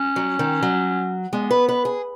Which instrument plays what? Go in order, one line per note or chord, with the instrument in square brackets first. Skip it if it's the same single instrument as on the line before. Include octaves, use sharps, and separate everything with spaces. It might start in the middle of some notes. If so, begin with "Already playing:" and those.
Already playing: [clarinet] C#4
[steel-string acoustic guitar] F#3
D#3
F#3
[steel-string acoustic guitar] G#3 [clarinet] B3
[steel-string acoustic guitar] B4
B4
G#4